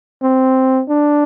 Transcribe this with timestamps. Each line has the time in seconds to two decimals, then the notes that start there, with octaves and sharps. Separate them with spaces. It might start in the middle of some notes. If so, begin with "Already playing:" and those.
0.22 C4
0.89 D4